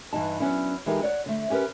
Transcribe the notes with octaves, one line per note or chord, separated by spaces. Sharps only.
G2 E3 D#4 A5
F#3 B3 C#4 D4 E4
E3 G#3 D#4 G4 A4 A#4
C#5 D5 F#5
D3 A3
C#4 G4 A#4 B4